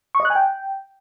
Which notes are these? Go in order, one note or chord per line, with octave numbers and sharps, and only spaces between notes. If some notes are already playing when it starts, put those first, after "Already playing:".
C#6
D#5
F#6
G#5
G5